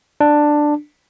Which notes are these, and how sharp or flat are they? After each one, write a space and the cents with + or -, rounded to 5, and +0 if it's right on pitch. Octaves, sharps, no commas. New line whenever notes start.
D4 +10